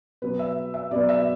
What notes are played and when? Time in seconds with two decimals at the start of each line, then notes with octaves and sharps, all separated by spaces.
0.22 B2 F#3 B3 B4
0.39 E5
0.74 E5
0.91 B2 F#3 B3 D5
1.09 E5